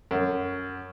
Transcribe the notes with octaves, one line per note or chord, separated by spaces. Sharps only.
F#2